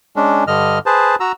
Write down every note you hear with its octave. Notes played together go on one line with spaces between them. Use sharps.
G#3 C#4 D4
G2 D3 D#5 F6
G#4 B4 C5 A5
F#4 A#5 E6